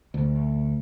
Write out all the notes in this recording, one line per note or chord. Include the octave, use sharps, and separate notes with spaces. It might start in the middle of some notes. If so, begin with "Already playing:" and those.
D2